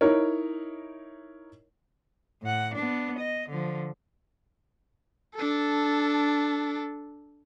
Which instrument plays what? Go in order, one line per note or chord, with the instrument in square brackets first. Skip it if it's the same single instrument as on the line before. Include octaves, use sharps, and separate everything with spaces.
[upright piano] D#4 E4 A#4 C#5
[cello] A2 F#5
B3 D4
D#5
D3 F3
[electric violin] D4 A4